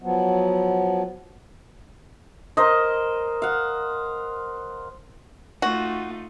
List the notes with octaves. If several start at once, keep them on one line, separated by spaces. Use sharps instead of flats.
F3 F#3 B3
A#4 C5 D#5
F5 F#5
A3 D#4 F4 F#4